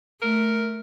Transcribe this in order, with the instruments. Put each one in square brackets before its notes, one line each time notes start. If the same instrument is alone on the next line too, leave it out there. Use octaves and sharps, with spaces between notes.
[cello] A3 [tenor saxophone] A#4